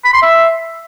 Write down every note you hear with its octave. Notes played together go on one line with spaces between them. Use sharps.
B5
C6
E5